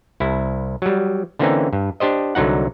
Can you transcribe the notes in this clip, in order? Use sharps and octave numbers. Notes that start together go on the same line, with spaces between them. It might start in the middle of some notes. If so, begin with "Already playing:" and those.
C2 E4
F#3 G3
D3 E3 A#3 C4 C#4 D#4
G2
D4 G4 C5 D#5
C2 D3 F#3 D#4 F#5